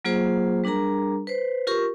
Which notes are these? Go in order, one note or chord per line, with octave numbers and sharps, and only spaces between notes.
F#3 A#3 F4 G#4 C5
G3 D4 G#4 A#4 A#5
B4 C5
F4 G4 A#4 C#6